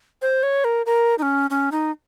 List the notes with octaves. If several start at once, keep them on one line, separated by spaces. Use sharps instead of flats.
C5
C#5
A#4
A#4
D#4
C#4
C#4
D#4